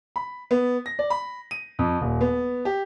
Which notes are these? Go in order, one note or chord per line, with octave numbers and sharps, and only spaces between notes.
B5
B3
A#6
D5
B5
D#7
F2
D#1
B3
G4